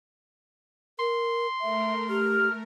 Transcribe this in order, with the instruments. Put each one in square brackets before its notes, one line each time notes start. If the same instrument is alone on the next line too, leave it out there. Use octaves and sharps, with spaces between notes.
[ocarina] A#4 [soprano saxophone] C6
[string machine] A3 A#4 [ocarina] E5
[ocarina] G4 [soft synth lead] F6